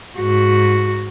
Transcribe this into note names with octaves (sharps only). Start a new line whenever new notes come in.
G#2 F#4